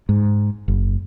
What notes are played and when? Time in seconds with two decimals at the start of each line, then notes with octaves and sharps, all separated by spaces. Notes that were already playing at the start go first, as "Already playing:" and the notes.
0.09 G#2
0.68 F#1